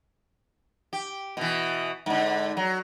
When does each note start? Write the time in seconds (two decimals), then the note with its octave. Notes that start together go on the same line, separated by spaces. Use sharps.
0.93 G4
1.37 B2 E3
2.06 G#2 D3
2.57 F#3